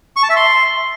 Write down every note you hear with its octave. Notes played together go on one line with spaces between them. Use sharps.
C#6
A5
E5
C6